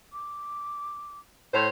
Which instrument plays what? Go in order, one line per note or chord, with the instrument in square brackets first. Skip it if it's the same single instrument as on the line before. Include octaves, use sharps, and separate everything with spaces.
[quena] D6
[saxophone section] A2 C5 [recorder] C#5